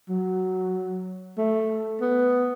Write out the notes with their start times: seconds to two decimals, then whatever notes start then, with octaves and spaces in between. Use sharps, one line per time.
0.09 F#3
1.38 A3
2.01 B3